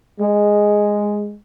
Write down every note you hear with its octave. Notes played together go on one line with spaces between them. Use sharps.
G#3